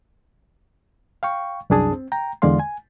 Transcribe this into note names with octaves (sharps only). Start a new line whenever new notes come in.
F5 G5 C#6
C2 F#2 D4 G#4 A5 D#6
C4
G5 A#5
E2 D3 G#3 D5 F5 C6
G#5